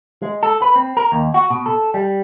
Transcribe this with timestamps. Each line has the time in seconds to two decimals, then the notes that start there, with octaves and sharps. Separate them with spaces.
0.22 G#3
0.43 A4
0.62 B4
0.76 C4
0.97 A#4
1.12 D#2
1.34 F#4
1.50 B2
1.66 A4
1.94 G3